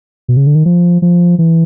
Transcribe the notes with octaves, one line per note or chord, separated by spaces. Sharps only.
B2
C#3
D3
D#3
F3
F3
E3